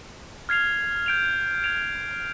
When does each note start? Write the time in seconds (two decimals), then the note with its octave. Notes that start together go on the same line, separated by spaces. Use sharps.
0.49 F6 G#6 C7 F7
1.06 G6 D7 F7
1.64 G#6 D7 F7